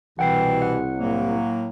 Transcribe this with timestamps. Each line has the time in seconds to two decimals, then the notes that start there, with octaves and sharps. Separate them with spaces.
0.19 C2 B2 E3 F#5 G5 C7
0.62 F#5
0.99 A2 F#3 A#3